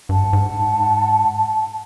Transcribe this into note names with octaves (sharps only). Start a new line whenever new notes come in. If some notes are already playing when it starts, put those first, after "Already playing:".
G2 F#5 A5
G#2